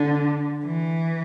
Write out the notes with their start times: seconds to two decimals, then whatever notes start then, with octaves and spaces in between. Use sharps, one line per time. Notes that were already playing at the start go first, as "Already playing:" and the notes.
Already playing: D3
0.64 E3